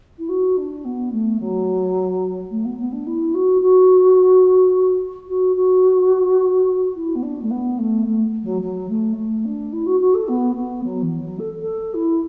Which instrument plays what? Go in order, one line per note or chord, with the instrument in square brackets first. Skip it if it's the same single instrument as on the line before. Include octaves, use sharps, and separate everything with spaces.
[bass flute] E4
F#4
D4
B3
A3
F#3
A3
B3
B3
D4
E4
F#4
F#4
F#4
F#4
E4
B3
D4
A3
B3
A3
A3
F#3
F#3
A3
A3
D4
E4
F#4
F#4
A4
B3
B3
F#3
E3
F#3
A4
A4
E4